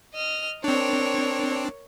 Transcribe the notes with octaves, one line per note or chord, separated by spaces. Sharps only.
D#5 F6
C4 D4 A#4 C#5